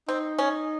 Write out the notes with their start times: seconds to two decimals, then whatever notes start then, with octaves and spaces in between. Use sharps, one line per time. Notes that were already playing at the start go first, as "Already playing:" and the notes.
0.08 C4 D#4
0.39 C#4